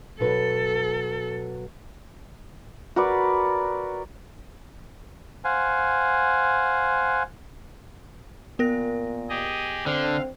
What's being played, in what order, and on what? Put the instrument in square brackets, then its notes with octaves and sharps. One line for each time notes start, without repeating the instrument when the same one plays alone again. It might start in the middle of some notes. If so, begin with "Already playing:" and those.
[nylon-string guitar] B2 F#3 B4 [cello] A4
[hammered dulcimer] F#4 A#4 B4 D5
[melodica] C5 F5 F#5 G#5
[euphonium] A#2 [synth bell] B3 A#4 A#6
[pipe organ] G4 G#4 D#5
[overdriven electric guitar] D3 [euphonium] C4 [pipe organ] F5